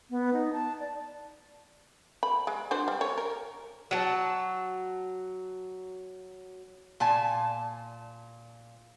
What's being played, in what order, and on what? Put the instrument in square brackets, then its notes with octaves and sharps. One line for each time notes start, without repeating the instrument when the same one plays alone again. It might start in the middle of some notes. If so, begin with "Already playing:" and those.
[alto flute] B3
D#4
A5
D5
[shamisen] B5
G#3
D4 F#4 C5
G3
C#5
A#4
[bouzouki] F#3 A5
[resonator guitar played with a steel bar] A#2 G#5 A5